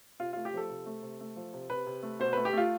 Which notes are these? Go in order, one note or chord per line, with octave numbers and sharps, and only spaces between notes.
C3 F4
A3 F4
G4
F3 A4
C3
A3
C3
A3
F3
C3
C3 B4
C3
A3
B2 C5
A3 B4
G4
A3 F4